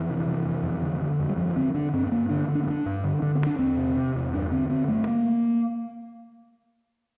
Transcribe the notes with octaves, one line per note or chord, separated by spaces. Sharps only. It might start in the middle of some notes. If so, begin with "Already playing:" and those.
Already playing: F2 E3
C3
C3
F2
F2
D3
D3
F2
G3
G2 F3
D3 C4
D3 D4
G2 C4
C4
G2 A#3
D3 D4
D3
D4
C4
G2
D4
G2
D3
D3 D4
C4
G2
D4
E2 C4
C3
C3
E2
G2 D4
D3 C4
D3 C4
G2 A3
A#3